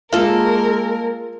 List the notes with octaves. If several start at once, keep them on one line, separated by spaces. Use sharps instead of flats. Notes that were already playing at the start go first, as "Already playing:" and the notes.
G#3 A#3 F4 A4 A#4